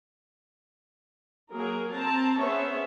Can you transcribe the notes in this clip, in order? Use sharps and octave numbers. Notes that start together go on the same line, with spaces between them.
F#3 A#3 G#4 A#4
C4 A5 A#5
B3 C#4 G#4 C5 C#5 E5